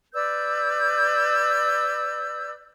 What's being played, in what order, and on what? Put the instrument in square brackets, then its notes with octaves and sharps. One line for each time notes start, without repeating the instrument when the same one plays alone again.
[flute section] B4 D5 E6 G6